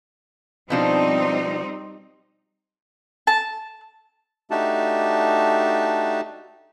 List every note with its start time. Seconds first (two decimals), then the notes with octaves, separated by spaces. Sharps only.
0.70 B2 F3 G3 C4 D4 D#4
3.27 A5
4.51 A3 D4 D#4 F#4 G4 A5